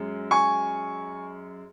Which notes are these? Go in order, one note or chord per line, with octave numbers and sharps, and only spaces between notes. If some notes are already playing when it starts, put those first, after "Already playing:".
Already playing: F#2 G#3
G#5 C#6